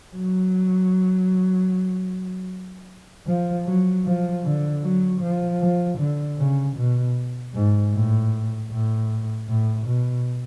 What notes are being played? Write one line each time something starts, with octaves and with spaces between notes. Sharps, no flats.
F#3
F3
F#3
F3
D3
F#3
F3
F3
D3
C#3
B2
G#2
A2
A2
A2
B2